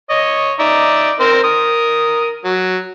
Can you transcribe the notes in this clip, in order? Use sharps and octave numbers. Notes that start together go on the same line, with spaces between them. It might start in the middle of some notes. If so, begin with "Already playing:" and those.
C#5 D#5
D#4 D5 E5
C4 A#4 C5
A#4 D#6
F#3